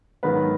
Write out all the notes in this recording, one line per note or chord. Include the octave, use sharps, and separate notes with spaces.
G#2 D#3 F#3 B3 B4